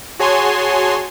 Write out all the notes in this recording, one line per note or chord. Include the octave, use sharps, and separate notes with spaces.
F#4 G#4 C#5 G#5 A5 C6